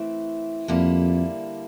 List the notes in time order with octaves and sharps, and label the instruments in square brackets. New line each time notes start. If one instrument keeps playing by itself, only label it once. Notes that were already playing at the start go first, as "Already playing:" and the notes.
Already playing: [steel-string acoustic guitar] E3 A3 C4 E4
[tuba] F2 [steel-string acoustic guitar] D3 G3 A#3 E4